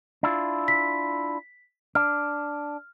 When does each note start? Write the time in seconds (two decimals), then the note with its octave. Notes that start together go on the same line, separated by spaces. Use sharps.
0.23 D4 E4 F4
0.68 B6
1.95 D4 F6